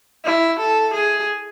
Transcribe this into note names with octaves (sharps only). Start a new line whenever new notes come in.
E4
A4
G#4